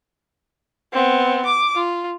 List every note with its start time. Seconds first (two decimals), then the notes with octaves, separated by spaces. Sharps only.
0.93 B3 C4
1.45 D6
1.75 F4